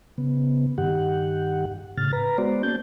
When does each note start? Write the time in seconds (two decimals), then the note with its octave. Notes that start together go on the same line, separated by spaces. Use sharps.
0.18 C#3 B3
0.78 G2 D#3 G4 F#5
1.97 A2 C#3 F6 A6
2.13 B4 A#5
2.38 G#3 B3 F#4 C5 D5
2.63 A#3 C#4 A5 G6